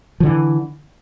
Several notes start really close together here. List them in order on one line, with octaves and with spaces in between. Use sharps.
F3 D3 E3